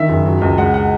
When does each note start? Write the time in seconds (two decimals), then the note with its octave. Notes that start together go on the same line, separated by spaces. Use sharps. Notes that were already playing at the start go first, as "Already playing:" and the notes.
Already playing: D#3 E5
0.09 F#1
0.25 F#3
0.41 C#2
0.58 G#3 F#5
0.74 F#5